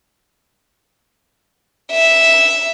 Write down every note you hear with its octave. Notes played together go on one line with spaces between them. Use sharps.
E5